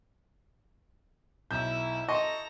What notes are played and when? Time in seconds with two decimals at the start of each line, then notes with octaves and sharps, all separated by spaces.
1.51 B1 E4 E5 G6
2.09 A4 D#5 A#5 C6 C#6